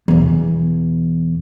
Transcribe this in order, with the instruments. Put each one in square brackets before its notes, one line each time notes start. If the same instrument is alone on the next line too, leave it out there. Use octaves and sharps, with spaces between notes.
[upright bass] E2 B2